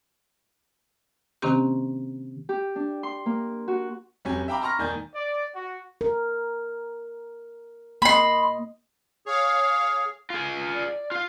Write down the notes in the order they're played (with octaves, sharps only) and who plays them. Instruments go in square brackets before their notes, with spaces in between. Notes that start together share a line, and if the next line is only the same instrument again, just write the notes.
[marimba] C3 D#3 A#3 C4 C#4 G4
[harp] G4
D4
C6
A#3
F#4
[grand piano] F1 F#3 C#4 G4 G#5
E5 F5 G5 A#5 B5 D6
A5 A#5 C6 C#6 F6 A#6
E1 D#3 A#3 D5 G#5 G6
[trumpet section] D5
F#4
[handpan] A#4
[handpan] A#3 D#5 [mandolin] B5 C6
[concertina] G#4 [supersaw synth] C#5 F5
[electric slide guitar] F4 G#4
[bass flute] D5
[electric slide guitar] F4 F5